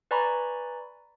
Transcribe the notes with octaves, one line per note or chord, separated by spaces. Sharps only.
B4 D5 G#5 A#5 B5 C#6